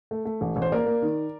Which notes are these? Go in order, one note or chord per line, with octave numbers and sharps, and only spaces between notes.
A3
A3
A1
A1
C5
A#3 A#4 D5
A#3
D#3